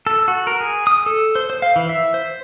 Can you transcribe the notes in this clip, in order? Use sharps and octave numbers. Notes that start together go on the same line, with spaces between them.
A4
F#4
A#4
G#4
D#6
A4
C5
C5
F5
E3
E5
C5